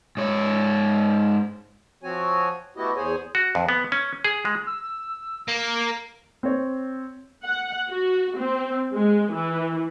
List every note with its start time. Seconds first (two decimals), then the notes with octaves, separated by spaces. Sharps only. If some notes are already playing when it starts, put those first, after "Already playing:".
0.17 G#2 C#5
2.03 F3 C4 F#4 C#5 G#5
2.77 A3 B3 E4 F#4 G4 D#5
2.96 E2 G#4 C5 C#5 G#5
3.35 F#4
3.55 F2
3.69 B3
3.92 C#4
4.25 G#4
4.45 G#3
4.67 E6
5.48 A#3
6.43 C4 C#5
7.44 F#5
7.89 F#4
8.38 C4
8.94 G#3
9.32 E3